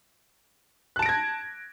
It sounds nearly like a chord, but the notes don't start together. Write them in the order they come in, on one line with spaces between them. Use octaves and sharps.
F#6 A5 D7 A#6 G#6